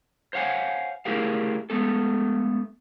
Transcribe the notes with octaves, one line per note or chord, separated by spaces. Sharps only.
C5 C#5 F5 F#5 G#5
A3 E4 G4 G#4 A#4 F5
G#3 A3 B3 A4